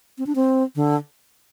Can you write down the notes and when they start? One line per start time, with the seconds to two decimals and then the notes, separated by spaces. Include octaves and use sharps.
0.18 C4
0.27 D4
0.35 C4
0.75 D3